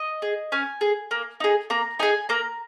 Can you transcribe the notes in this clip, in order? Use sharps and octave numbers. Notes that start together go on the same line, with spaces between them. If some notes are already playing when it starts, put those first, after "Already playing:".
Already playing: D#5
G#4
C#4 G#5
G#4
A#3
D#4 G#4
A#3 A#5
D#4 G#4 G#5
A#3 A#5